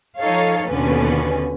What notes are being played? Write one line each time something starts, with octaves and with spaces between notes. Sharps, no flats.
F3 D#4 A4 C#5 F5
D#2 B2 D3 C#4 B4